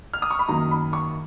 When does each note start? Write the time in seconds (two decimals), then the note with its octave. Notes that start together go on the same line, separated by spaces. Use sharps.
0.13 F6
0.22 D#6
0.31 C#6
0.39 B5
0.48 F#2 D#3 A#3 A#5
0.71 B5
0.93 C#6